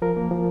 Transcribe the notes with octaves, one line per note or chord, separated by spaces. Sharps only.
F3 A#4
A#3
F3